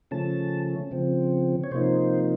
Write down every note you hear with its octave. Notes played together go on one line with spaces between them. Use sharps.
C#3 F3 A3 C#4 A5
C#3 F3 C4
C#5
C3 F3 A#3 D#4 C5